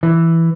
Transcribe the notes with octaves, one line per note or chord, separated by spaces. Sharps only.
E3